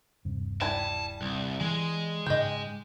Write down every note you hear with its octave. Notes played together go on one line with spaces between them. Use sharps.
D#1 G2 C3
G3 E4 G#5 A5
C2
E3 G#3
G#2 C#3 G4 D#5